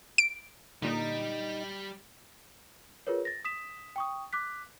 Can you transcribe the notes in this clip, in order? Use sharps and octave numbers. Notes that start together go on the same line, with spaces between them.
D7
A#2 D3 G3 D#4
F4 G#4 A#4 B4 C#5
A6 A#6
D#6 B6 E7
G5 C#6 D#6
D6 F#6 B6